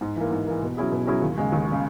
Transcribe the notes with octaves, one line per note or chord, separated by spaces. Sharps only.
G#2
E3 A#3
G#2
E3 A#3
B2
F#3 C#4 E4 G#4
B2
F#3 C#4 E4 G#4
D#2
C#3 G#3
D#2
C#3 G#3